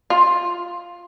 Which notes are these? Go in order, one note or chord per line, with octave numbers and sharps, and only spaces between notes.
F4